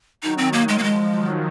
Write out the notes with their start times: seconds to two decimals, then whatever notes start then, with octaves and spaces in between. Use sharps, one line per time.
0.23 D#3 F#3 D#4
0.38 C4
0.52 D#3 A#3
0.68 G#3
0.78 A#3
0.84 F3 G#3
1.14 D#3 F#3